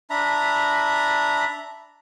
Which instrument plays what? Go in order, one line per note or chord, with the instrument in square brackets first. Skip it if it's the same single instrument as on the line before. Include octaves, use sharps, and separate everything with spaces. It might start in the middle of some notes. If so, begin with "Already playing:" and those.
[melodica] D4 E5 A#5 B5